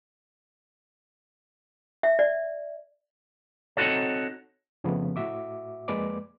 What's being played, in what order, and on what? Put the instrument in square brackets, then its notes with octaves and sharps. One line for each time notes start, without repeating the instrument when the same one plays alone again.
[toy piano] E5
D5
[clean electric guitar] C4 D#4 F4 F#4 A4 C#5
[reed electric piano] F2 C#3 F3 A3 B3
A2 F#4 E5 D6
F2 G#3 A#3 B4 D5 D6